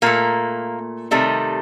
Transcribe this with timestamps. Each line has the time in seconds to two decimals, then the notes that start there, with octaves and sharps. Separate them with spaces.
0.02 A#2 A3 A#3
1.11 C3 D#3 G3 A3